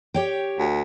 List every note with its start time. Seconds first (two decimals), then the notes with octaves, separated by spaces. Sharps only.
0.14 G4 C#5 G5
0.59 D2